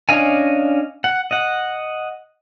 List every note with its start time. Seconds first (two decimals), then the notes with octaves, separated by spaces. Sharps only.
0.09 C#4 D4 D#5 F5 G#5
1.04 F#5
1.31 D#5 F#5